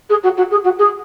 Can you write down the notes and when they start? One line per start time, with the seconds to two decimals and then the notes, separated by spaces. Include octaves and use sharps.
0.09 G#4
0.23 F#4
0.37 F#4
0.51 G#4
0.64 F#4
0.78 G#4